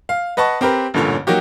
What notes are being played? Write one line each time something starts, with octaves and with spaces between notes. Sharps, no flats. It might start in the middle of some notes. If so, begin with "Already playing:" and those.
F5
B4 D#5 F#5 A5 C#6
C4 G4 A#4 B4
A1 G2 A#2 D3 C#4 C#5
F#3 A#3 D#4 F#4 G4